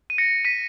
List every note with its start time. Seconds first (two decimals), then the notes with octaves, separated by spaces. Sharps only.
0.10 D#7
0.18 A#6 C#7
0.45 B6 D#7